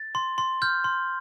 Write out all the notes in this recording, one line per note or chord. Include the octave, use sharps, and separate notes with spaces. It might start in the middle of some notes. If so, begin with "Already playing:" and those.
Already playing: A6
C6
C6
F6 G6
C6